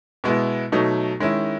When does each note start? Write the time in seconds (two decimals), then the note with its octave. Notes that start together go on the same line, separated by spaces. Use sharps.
0.24 B2 G#3 B3 E4
0.72 B2 F#3 A3 D#4
1.20 D#3 G#3 C#4 E4